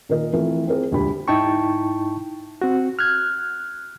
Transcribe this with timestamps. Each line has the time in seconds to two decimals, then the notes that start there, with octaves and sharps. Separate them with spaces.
0.09 A#2 D#3 A#4 D#5
0.33 E3 F3 A3 C4 A4 A#4
0.67 C4 G#4 A#4 C5
0.91 E1 D2 A#2 G4 B5
1.28 G#2 D#4 E4 G5 A5 C#6
2.62 C4 F#4
2.99 F6 F#6 G#6